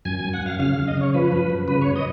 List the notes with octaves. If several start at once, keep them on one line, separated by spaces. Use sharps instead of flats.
F#2 G#5
G#5
F#2
F#5
F#2 F5
C#3 F5
F5
C#3
D#5
C#3
C#5
F3 B4
F#2
F#2
C#3 B4
C#5
F#2
D#5